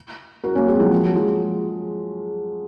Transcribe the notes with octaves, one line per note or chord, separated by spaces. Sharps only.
F#4 A#4
A#3 C#4
G#3 C4
F#3
F3 G#3
F3
F#3
F3 G#3